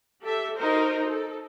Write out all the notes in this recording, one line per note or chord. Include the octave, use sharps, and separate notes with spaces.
G4 A4 E5
D#4 F#4 A#4 C5
A4